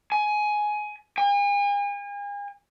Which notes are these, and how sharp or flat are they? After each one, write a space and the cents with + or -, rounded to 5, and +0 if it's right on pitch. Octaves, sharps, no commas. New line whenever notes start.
G#5 +15
G#5 -40